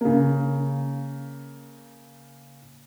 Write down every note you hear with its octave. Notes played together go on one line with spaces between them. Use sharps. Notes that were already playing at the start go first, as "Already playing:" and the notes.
C#3 A#3